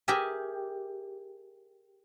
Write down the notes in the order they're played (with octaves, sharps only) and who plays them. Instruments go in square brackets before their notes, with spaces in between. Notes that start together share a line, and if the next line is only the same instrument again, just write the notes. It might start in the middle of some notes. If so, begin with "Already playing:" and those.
[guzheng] G4 G#4 A#4 E5 G#5